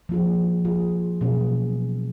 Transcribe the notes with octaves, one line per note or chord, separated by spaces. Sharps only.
F3 A#3 F4 G#4
F3 A#3 F4 G#4
B2 F#3 A#3 C#4 G#4